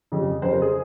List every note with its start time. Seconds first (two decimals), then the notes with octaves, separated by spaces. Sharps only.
0.12 F2 C#3 G3
0.42 F2 C#3 G3 C5
0.52 A#4
0.62 G#4